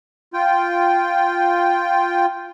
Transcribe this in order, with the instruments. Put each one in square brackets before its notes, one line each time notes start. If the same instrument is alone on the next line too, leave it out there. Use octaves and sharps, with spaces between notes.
[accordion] F4 G5